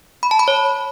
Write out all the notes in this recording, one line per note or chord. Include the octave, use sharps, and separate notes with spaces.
B5
A5
B5
C#5